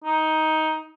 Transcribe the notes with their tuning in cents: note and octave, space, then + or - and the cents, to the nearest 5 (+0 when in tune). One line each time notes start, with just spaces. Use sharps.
D#4 +15